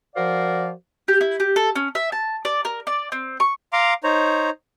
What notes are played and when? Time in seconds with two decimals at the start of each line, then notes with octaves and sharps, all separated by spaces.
0.16 F3 F#4 A#4 C5 D5 F5
1.08 G4
1.21 E4
1.40 G4
1.56 A4
1.76 C#4
1.95 E5
2.12 A5
2.45 D5
2.65 A#4
2.87 D5
3.12 C4
3.40 C#6
3.73 F5 A#5 C6 D6
4.04 D#4 C5 C#5 A#5